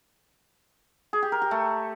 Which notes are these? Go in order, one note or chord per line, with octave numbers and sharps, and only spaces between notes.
G#4
G4
A#4
G4
A3